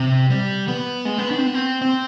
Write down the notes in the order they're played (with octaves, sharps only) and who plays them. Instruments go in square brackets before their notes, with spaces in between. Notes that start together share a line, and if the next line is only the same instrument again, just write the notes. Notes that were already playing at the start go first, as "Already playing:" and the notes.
Already playing: [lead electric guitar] C3
G3
B3
G#3
B3
D4
C4
B3
C4
C4